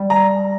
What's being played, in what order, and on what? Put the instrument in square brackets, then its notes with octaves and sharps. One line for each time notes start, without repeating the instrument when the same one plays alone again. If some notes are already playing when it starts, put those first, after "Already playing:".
Already playing: [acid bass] G3
[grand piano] A#5